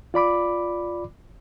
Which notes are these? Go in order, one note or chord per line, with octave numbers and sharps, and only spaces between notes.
F4 D5 B5 D6